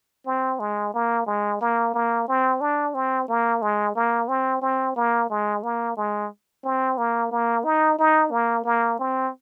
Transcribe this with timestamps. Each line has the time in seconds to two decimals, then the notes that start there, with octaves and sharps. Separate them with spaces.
0.26 C4
0.60 G#3
0.94 A#3
1.26 G#3
1.61 A#3
1.94 A#3
2.28 C4
2.60 D4
2.94 C4
3.28 A#3
3.62 G#3
3.95 A#3
4.28 C4
4.62 C4
4.96 A#3
5.30 G#3
5.63 A#3
5.97 G#3
6.64 C4
6.97 A#3
7.31 A#3
7.64 D#4
7.99 D#4
8.31 A#3
8.64 A#3
8.99 C4